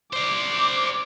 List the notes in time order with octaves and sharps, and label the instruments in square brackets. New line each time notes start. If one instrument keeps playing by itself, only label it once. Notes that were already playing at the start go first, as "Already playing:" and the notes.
[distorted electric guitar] C5 D5 [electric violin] D6